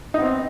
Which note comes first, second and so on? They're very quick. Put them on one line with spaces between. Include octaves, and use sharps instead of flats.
D#4 B3 C4